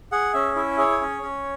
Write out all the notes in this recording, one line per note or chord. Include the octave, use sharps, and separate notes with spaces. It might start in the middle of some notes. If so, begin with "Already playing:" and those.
G#4 F#5
C#4 E5
E4 E5
G#4 C#5
C#4
C#4